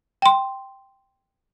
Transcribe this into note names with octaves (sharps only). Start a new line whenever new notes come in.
G5 C6